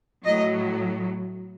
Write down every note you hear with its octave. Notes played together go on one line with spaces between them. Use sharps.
A2 F#3 D#5